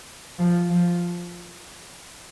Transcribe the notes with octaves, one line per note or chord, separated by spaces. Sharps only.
F3
F3